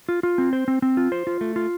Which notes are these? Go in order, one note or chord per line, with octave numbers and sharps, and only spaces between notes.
F4
F4
C4
C5
C4
C4
F4
C5
F4
A3
F4